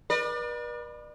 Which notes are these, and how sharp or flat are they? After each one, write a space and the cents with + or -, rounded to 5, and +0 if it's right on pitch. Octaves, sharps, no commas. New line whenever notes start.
B4 -40 D5 +35